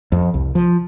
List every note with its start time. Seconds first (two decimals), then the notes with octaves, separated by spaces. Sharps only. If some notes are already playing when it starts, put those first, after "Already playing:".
0.12 F2
0.34 C2
0.55 F3